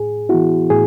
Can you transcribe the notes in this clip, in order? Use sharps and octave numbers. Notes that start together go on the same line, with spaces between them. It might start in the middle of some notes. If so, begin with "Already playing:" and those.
Already playing: A2 G#4
E3 B3 E4 F#4
A2 G#4